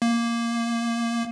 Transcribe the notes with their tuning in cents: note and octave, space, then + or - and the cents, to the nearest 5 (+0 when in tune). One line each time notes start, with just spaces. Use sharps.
A#3 +0